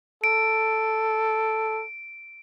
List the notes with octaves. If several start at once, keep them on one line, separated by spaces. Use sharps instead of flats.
A4 D7